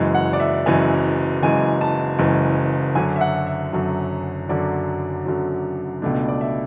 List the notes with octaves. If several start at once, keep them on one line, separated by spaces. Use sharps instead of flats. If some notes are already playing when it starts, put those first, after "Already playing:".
Already playing: F#1 F#2 E3 G#3
F#5
D5
E5
F#1 F#2 E3 G#3 G#5
F#1 F#2 E3 G#3 G#5
A5
F#1 F#2 E3 G#3
F#2 D3 F#3 G#5
E5
F#5
E5
F#2 D3 F#3
F#2 D3 F#3 D5
F#2 D3 F#3
C#2 B2 A3 D4
D5
E5